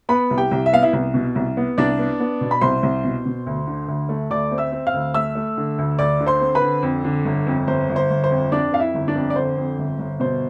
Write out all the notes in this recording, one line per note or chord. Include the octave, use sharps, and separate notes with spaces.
B3 B4 B5
C2
G4 G5
C2
E5
B3 F5
E4 E5
C2
B2
C2
B3
C2 D4 D5
B3
B3
B2
B5
C2 C5 C6
C2
B2
B2
D2
D3
D2
A3
D2 D5 D6
C4
E5 E6
C4
F5 F6
D2
A3 E5 E6
A3
D3
D2
D2 D5 D6
D3
C5 C6
C4
B4 B5
D3
F2
D3
G1
F2
G1 C5
G1
C5
G1
C5
F2
F2 D4 D5
F2 F5
E4 E5
G1
D4 D5
F2
D5
D3 C5
F2
G1
G1
B2 C5